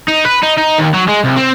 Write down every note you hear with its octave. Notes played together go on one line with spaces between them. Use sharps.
D#4
B4
D#4
D#4
D#2
F#3
G#3
C2
C4